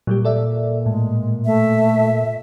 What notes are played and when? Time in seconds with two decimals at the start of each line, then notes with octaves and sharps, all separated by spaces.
0.07 A#2 F#3 G3 G4
0.25 A4 D5 E5
0.86 A2 G#3
1.46 A3 E5